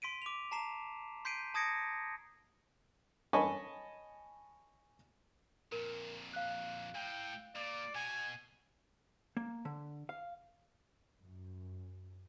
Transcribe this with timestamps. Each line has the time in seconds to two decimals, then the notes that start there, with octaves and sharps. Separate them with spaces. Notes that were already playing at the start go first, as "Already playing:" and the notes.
0.02 C6 B6 D7 D#7
0.22 D6 F7
0.51 A5 A#5 C7 E7
1.25 C6 G6 B6 C7 D7 D#7
1.54 A5 D#6 G#6 A#6 C#7 D7
3.33 C#5 D#5 G#5 A5 B5 C#6
5.72 F2 A#2 A#4
6.34 F5 F#6
6.95 A2 G5
7.56 A#2 D5
7.95 B2 G#5
9.37 A#3
9.65 D3
10.09 F5
11.19 F#2